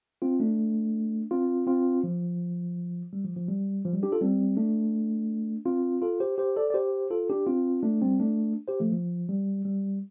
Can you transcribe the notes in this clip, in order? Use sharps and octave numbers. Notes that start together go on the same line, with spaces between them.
C4 F4
A3 D4
C4 F4
C4 F4
F3
G3
F3
F3
G3
F3
G3
D4 G4
F4 A4
G3 C4
A3 D4
C4 F4
F4 A4
G4 C5
G4 C5
A4 D5
D5
G4 C5
F4 A4
D4 G4
C4 F4
A3 D4
G3 C4
A3 D4
G4 C5
F3 A3
F3
G3
G3